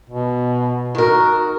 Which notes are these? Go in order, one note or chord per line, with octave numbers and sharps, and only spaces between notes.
B2
D#3 F#4 A#4